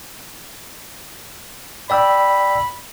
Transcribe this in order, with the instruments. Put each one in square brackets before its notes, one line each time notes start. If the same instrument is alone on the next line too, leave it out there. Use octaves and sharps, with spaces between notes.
[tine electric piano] D5 G5 E6 [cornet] B5